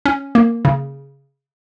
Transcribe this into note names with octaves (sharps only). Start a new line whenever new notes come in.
C#4
A#3
C#3